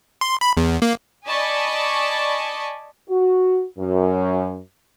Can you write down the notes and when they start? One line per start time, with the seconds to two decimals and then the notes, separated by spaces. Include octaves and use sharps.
0.21 C6
0.41 B5
0.57 E2
0.82 A#3
1.26 D5 D#5 G#5 A5 B5 C#6
3.09 F#4
3.78 F#2